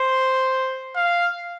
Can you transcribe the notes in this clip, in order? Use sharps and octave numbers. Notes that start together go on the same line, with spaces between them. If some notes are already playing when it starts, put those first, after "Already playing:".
Already playing: C5
F5